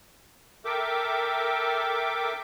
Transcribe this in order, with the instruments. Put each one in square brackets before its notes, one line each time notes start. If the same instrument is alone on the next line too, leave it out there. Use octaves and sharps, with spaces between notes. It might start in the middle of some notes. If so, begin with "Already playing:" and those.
[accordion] A4 A#4 E5 G5 D6